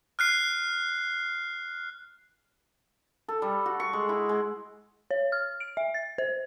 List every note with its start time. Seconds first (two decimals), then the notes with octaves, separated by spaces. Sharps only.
0.19 F6 F#6 C7
3.28 A4
3.42 G3
3.66 F#4
3.80 C#6
3.93 G#3
4.09 E4
4.29 G#3
5.11 C#5
5.32 F6
5.60 D7
5.77 E5
5.94 A6
6.18 C5